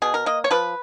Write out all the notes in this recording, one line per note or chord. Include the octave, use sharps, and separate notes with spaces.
B2 G#4
A#4
A#3 D#5
C#5
F3 B4